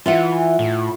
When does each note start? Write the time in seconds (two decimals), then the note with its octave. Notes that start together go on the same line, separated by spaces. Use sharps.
0.06 E3 F4 E5 F#5
0.59 A2